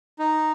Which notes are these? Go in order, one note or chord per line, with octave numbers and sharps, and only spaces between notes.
D#4